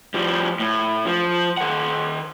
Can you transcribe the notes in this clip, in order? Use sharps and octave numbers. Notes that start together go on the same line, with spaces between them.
F3 G3
A2
F3
D#3 F#5